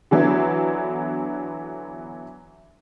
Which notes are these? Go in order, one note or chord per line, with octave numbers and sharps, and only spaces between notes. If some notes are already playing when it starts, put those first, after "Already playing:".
D3 E3 F#3 B3 E4